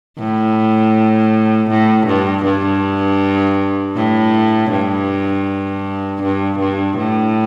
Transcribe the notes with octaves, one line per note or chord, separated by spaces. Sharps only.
A2
A2
G2
G2
A2
G2
G2
G2
A2